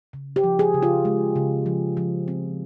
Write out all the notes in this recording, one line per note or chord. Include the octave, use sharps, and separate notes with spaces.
C#3
G4
F3
G#4
C#3
F4
G#3
C#3
F3
F3
C4